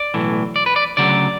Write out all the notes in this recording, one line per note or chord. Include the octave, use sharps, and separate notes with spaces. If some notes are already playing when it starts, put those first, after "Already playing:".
Already playing: D5
B1 A2 E3
D5
B4
D5
D2 C#3 F#3 D5